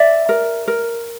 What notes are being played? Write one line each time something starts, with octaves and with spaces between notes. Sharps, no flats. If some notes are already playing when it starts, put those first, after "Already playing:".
Already playing: D5 E5
A#4
A#4